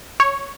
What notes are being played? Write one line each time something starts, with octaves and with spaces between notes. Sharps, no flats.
C#5